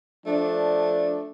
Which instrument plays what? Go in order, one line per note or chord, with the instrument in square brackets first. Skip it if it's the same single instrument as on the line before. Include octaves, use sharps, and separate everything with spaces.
[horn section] F3 A3 D4